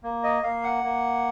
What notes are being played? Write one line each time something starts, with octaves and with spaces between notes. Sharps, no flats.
A#3
D#5
A#3 F5
F#5
A#3